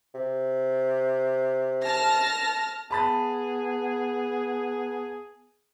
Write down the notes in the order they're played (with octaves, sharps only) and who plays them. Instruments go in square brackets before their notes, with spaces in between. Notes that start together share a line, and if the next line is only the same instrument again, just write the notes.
[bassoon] C3
[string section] A5 F6 A#6
[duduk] B3 [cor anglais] G#4 [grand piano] A5 B5 A6